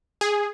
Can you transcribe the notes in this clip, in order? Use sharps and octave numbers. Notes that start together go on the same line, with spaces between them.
G#4